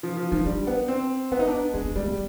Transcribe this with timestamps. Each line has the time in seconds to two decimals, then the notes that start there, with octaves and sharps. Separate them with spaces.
0.03 F3
0.17 F3
0.31 F3 D#4
0.45 G3 D4
0.67 B3
0.88 C4
1.31 B3 D4
1.39 D#4
1.47 D4
1.73 G#3 D4
1.84 B3
1.96 G3 G#3
2.06 B3